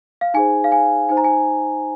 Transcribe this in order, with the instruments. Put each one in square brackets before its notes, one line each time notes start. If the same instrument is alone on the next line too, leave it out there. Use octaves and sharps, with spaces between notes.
[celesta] F5
D#4 G#4 C5 G#5
F5
G#5
D#4 C5 G#5
A#5
G#5